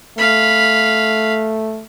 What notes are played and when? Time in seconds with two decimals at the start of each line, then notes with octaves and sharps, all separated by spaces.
0.18 A3 F5 B5